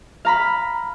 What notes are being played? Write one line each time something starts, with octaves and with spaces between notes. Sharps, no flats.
F5 A#5 B5